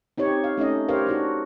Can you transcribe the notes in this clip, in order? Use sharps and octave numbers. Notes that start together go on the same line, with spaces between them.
C4 D#4 G4 C#5
F5
A3 C#4 D#4 D#5
G4 A#4 C5 C#5 F5
D4 D#4 F#4